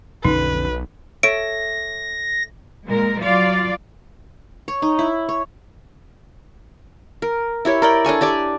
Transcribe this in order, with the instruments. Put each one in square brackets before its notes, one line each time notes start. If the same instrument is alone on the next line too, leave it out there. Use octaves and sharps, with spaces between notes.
[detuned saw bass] B1 [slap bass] F2 D3 C#4 [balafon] D#4 [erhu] B4
[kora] A4 C#5 E5 [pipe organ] A#6 [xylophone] D7
[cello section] A#2 G#3 A#4
F#3 F4 D5 F5
[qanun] C#5
D#4
E4
C#5
A#4
E4 G4 C#5
A#4 D5 G5
D4 A4 G#5 C#6
G4 D5 G#5 D6